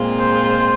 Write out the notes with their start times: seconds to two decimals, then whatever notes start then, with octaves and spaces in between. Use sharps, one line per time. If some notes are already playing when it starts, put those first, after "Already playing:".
Already playing: A#2 G#3 C4 F4
0.19 C5